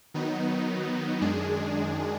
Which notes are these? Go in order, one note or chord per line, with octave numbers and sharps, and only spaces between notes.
D#3 F#3 B3 D#4
F#2 D#3 G#3 D4 G#4